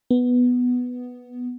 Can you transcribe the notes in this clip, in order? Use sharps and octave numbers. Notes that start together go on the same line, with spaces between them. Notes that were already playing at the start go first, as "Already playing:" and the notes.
B3